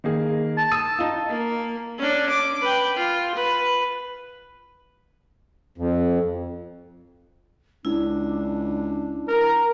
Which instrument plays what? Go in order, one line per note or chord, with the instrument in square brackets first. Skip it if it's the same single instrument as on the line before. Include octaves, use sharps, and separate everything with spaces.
[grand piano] D#3 A#3 G#4
[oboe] A5
[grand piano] D#6 E6 D#7
D#4 F4
[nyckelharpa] A#3
C#4 D4
D6
B4 G5
F4
B4
[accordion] F2
[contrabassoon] C#2 [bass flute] D4 [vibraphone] E4
[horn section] A#4